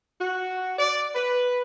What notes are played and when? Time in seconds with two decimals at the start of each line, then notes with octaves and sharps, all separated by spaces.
0.20 F#4
0.78 D5
1.14 B4